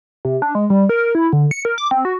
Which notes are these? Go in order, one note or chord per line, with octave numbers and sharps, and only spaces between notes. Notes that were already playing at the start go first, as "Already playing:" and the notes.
C3
D4
G#3
G3
A#4
E4
D3
C#7
A#4
D6
C4
F#4